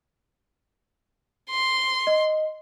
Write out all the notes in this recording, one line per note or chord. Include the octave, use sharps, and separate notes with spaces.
C6
D#5